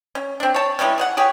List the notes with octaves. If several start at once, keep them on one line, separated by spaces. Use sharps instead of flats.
C#4
C4 D4
C#5 A5
E3 G3 G#3 C#4
G#4 C#5 F#5
G4 G#4 C#5